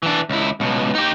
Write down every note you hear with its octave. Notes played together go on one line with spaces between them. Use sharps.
E3 D4
C#2 E4
C#2 B2
D#4 G4